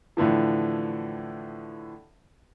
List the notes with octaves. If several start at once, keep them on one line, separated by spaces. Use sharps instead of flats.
A2 D3 E3 F3